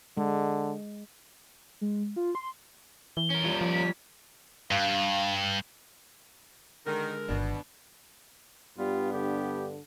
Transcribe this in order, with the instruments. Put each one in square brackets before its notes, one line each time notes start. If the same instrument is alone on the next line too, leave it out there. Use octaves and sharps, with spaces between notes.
[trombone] D3 [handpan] G#3
[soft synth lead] G#3
F4
C6
[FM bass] E3 [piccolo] G7
[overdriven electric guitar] C#4 A#4
[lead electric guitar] G3 F4
[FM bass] F3
[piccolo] B6
[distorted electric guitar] G2 [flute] F5
[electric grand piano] D3 G#3 [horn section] D#3 [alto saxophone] A#4
[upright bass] G1 D#3 [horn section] B2 [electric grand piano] D4
[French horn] G2 [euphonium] G3 [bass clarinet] B3 [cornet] F4
[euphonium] D3 [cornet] G4